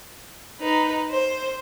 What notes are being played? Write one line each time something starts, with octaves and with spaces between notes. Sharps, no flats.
D#4 B4
C5